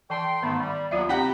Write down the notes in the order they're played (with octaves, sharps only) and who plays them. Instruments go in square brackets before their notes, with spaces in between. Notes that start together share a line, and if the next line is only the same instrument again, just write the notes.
[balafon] E3 A5 [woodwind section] A4 G5 C6
[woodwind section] G#2 A3 [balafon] D#3 B3 B5
[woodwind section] G3
[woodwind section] D#2 F#3 B3 [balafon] F4 D5 E5
[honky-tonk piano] C3 G4 F#5 [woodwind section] A#5 B5